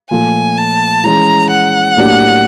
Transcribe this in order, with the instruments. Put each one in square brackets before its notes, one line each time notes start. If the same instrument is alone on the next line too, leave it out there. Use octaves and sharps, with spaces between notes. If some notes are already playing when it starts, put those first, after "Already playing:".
[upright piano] A#2 F3 A3 [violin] G#5
[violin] A5
[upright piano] E3 G#3 C#4 [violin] A#5
[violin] F#5
[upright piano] A2 F#3 A#3 D4 G4